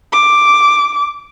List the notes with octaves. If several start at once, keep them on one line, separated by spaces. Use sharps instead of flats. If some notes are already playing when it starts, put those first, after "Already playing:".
D6